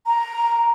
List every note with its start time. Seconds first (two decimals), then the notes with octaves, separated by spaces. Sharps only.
0.06 A#5